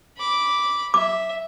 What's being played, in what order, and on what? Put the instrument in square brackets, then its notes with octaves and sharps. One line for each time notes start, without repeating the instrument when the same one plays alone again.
[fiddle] B5 D6
[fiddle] E5 [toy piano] D6